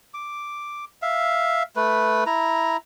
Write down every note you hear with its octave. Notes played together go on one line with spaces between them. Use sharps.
D6
E5 F5
A3 B4
E4 A#5